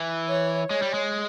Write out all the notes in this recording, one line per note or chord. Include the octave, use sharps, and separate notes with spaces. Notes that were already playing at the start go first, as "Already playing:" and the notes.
Already playing: E3
C#5
G#3 C#5
G3
G#3